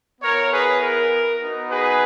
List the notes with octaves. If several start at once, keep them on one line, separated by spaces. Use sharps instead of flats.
B3 E4 A#4 C#5
G#4 B4
A#4
B3 D#4 F#4
G#4 B4